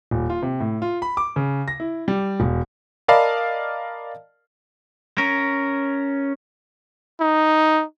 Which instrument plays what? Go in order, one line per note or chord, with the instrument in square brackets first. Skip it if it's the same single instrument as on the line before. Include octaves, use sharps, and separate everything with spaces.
[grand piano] D#1
F4
C3
A2
F4
B5
D6
C#3
A#6
E4
G3
E1
[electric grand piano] A#4 D5 D#5 F5 A5 B5
[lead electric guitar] C#4 A#4
[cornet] D#4